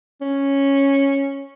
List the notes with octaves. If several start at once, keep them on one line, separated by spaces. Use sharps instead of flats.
C#4